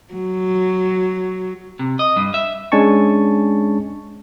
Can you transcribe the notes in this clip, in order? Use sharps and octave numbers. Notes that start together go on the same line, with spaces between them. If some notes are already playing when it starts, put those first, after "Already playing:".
F#3
C3
D#5
G2
E5
G#3 C#4 D4 G#5 A5 C#6